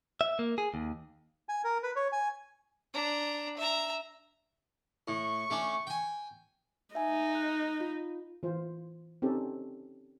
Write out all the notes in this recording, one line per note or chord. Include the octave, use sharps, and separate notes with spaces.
E5
A#3
G#4
D#2
G#5
A#4
B4
C#5
G#5
D4 A#5
E5 A#5
A2 C#6
A3 C#4 D4
G5 G#5
D#4 E5 G#5
F#6
F4
E3 F4 C5
C4 C#4 D#4 G4 A4